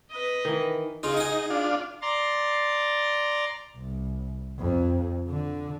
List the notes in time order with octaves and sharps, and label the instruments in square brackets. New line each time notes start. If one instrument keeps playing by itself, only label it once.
[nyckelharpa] B4 D#5
[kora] D#3 E3
[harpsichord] C#3 F4 [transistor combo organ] D#4
[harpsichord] G#4 F#5
[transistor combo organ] D4 F4
[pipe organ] D5 A#5 C6 A6
[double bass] C2
F2
D3